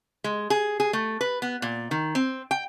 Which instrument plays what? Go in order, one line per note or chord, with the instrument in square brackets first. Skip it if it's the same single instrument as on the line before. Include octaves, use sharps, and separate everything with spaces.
[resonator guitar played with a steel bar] G#3
G#4
G#4
A3
B4
B3
A#2
D#3
C4
G5